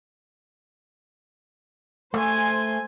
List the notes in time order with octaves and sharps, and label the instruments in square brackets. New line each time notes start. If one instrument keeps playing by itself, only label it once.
[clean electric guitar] A3 [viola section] C5 G#5